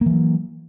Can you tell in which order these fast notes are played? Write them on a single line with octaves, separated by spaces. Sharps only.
A#3 E3 F#3